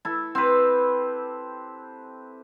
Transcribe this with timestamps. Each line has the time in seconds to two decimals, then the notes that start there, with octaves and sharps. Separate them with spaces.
0.05 E4 A4
0.35 C4 G4 B4